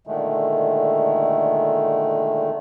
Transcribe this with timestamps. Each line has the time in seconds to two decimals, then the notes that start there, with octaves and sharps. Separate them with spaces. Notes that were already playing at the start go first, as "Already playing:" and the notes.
0.07 A#2 D3 D#3 G#3 A3